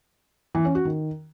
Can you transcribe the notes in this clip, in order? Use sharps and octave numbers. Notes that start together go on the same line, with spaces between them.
E3
C#4
F#4
D#3